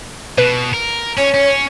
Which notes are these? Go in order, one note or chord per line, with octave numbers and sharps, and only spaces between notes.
B2 B4
A#4
C#4 C#5
C#4